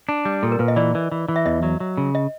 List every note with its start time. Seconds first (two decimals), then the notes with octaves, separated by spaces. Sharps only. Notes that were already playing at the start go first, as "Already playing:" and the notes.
0.09 D4
0.25 G3
0.43 A#2 A4
0.52 A#4
0.59 A#2 B4
0.68 D#5
0.76 E3 D5
0.95 E3
1.12 E3
1.28 E3
1.36 E5
1.46 E2 D#5
1.63 F#3
1.80 F#3
1.97 C#3
2.15 D#5